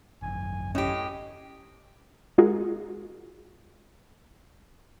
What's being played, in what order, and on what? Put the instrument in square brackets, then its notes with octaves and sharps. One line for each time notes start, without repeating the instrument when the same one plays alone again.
[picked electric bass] G#1 F#2 [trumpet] G#5
[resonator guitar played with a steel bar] A2 G4 [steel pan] C#4 [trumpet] D#5
[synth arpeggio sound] G#3 F4 F#4 G#4 A#4